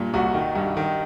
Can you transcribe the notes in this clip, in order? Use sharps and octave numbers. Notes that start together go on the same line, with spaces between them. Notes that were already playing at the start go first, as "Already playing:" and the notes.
Already playing: G2 A#2
C2 F#4
D#3
G2
D#3